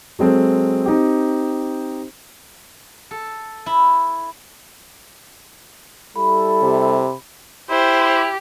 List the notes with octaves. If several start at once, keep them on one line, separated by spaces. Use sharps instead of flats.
F#3 G#3 C4 A4
C4 D#4 G4
A4
E4
G3 E4 A4 B5
C3
E4 G4 C5